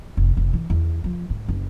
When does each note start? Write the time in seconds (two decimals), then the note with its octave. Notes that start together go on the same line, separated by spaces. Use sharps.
0.17 F1
0.37 F1
0.53 E3
0.70 E2
1.04 F3
1.30 G#2
1.48 F#1